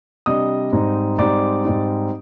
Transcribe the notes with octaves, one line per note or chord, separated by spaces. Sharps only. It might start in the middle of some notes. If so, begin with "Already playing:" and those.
C3 G3 D4 D#5 D#6
G#2 G3 C4 D#4
G#2 G3 C4 D#4 D5 D6
G#2 G3 C4 D#4